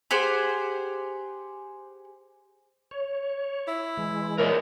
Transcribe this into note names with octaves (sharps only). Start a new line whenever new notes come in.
G4 G#4 C5 F#5
C#5
E4
E3 G#3
A#2 A#4 C#5 D#5